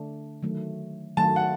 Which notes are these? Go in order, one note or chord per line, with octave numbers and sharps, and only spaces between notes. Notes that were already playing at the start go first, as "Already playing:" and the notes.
Already playing: D3 A3 D4 A4
D#3 F#3 A3
D#3 F#3 A3 A5
F#5